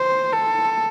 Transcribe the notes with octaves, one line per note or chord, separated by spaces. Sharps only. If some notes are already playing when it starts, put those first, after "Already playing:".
Already playing: C5
A4